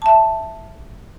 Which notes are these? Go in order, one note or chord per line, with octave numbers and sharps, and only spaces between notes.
E5 A5